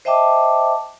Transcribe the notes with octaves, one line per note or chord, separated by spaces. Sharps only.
C5 D#5 E5 G5 A5 D6